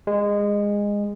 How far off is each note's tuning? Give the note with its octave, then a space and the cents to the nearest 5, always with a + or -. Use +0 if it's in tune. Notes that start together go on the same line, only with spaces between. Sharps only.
G#3 -20